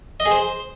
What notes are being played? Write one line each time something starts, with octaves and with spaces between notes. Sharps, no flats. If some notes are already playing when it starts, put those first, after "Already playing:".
D#5
G#4
C5